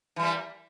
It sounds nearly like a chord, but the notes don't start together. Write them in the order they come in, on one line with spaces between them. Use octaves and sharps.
E3 G3 A#3